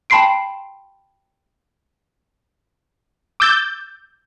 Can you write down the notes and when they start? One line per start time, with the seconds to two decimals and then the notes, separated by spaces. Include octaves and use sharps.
0.10 G5 A5 B5 C6 C7 D7
3.40 D6 E6 G6 A6